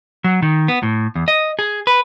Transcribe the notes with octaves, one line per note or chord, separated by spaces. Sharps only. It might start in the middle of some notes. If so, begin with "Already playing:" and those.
F#3
D#3
B3
A2
E2
D#5
G#4
B4